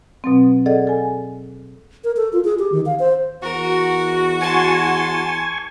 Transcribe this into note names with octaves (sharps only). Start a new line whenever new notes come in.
B2 F#3 C4
G#4 A4 D5 D#5 F#5
A4 G#5
A#4
A4
F4
G#4
G4
D#3
F5
C5
E2 F#4 A#4
G#5 A5 C6 C#6